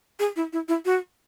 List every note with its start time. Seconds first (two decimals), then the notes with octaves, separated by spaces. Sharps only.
0.19 G#4
0.36 E4
0.53 E4
0.68 E4
0.85 F#4